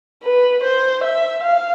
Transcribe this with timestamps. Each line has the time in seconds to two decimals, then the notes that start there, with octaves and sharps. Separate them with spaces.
0.24 B4
0.64 C5
1.04 E5
1.43 F5